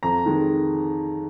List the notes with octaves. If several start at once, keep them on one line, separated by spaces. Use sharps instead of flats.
F2 A#5
D#3 G#3